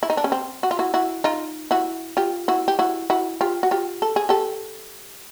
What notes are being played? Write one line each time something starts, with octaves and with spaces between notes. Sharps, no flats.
E4
D#4
D4
C#4
C4
F#4
F4
E4 F#4
E4 F#4
D#4 F4
E4 F#4
F4 G4
E4 F#4
G4
E4 F#4
E4 F#4
F4 G4
F#4
F4 G4
A4
G#4
G4 A4